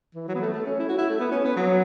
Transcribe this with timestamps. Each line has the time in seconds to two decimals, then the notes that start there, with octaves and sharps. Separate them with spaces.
0.15 E3
0.28 F#3
0.35 B3
0.41 A3
0.54 A3
0.66 C#4
0.79 E4
0.89 F#4
0.98 E4
1.10 A3
1.20 B3
1.31 C#4
1.44 B3
1.56 F#3